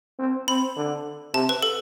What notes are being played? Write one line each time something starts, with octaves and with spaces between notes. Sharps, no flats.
C4
C4 B5
D3
C3 A5
B4
A4